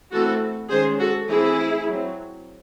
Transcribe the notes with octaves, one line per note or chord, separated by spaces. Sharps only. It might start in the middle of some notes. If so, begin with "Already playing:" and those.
E3 A3 C4 F#4 A4
D#3 G#3 C#4 G#4 C5
F#4 A4
E3 A3 C4 E4 G#4
F#3 C4